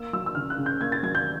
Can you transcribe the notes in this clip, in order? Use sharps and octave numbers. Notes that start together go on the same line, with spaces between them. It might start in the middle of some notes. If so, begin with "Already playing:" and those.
Already playing: A#3 E6
F#3 E6
E6
C#3 F6
F#6
C#3
G6
A#3 G#6
A6
F#3 G#6
G6